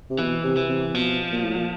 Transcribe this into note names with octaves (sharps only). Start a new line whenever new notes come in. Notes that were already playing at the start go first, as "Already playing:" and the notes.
C3
B2 E3
C3
E3
C3
B2 F3
A#2
A2
A#2